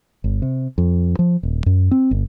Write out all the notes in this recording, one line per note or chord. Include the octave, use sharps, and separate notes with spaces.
G1
C3
F2
F3
D#1
F#2
C4
G1